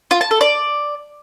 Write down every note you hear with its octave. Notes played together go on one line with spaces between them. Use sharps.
F4
A5
A4
D5